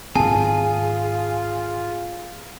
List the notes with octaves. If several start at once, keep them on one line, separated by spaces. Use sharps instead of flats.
G#2 D#3 C4 F4 G#4 A5